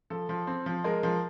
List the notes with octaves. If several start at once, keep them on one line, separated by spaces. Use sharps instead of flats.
F3 A4
F3
C4
F3
G#3 A#4
F3